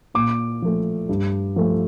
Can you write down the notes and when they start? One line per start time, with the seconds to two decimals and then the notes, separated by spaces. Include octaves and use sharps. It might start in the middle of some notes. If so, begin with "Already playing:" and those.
0.14 A#2 D6
0.62 F3 A3
1.09 G2
1.56 F3 A3